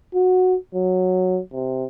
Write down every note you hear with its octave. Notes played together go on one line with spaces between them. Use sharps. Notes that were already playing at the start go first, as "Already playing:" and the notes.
F#4
F#3
C3